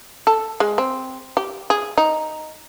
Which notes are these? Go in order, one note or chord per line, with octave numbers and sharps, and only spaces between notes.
A4
G#3
C4
G4
G#4
D#4